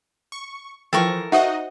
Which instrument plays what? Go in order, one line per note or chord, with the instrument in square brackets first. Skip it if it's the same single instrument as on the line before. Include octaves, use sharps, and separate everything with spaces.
[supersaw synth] C#6
[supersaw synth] E3 F3 [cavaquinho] A4 A#4 C#6 [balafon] G5
[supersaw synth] D#4 F#4 D#5 [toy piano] C5 F#5 [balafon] E5